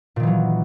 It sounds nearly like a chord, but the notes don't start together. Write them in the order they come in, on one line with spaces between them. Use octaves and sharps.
A#2 D#3 E3 F#3